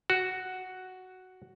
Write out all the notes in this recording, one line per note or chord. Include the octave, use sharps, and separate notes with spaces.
F#4